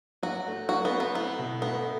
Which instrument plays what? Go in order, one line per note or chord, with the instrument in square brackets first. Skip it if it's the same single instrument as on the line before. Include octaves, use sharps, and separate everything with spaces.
[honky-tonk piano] F#3 [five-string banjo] F#4
[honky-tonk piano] A3
[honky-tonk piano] F#3 [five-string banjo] F#4
[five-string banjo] B3
[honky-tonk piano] C4
[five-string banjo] B3
[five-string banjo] B3 [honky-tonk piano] E4
[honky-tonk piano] B2
[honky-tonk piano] A3 [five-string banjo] B3